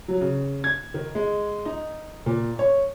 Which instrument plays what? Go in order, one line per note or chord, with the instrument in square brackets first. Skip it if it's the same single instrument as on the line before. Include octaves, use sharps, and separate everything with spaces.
[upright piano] F#3
C#3
G#6
D#3
G#3
D#4
A#2
C#5